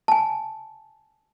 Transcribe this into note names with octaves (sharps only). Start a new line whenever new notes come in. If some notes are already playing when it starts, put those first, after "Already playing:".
G#5 A5